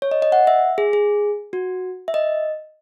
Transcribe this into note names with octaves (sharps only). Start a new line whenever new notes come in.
C#5
D#5
D#5
F#5
E5
G#4
G#4
F#4
E5
D#5